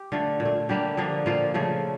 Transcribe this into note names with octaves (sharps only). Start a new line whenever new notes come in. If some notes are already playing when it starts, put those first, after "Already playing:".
Already playing: G4
D3 A3 F4
A#2
A3
D3 G3 A#3 G4
D3 F3 A#3
A#2 F3 A#3 F4
C#3 F3 A3